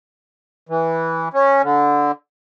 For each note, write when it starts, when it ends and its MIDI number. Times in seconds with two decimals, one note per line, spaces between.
0.69 1.29 52
1.34 1.62 61
1.63 2.12 50